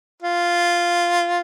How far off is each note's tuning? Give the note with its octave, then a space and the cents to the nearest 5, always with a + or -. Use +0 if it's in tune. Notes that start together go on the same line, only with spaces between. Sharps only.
F4 -5